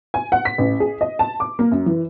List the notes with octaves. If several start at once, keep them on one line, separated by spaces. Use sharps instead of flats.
G#5
F#5
B6
A1
G#4
D#5
A5
D6
A#3
F#2
E3